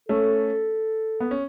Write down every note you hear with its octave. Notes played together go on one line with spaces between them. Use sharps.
A3 C#4 A4
B3
C#4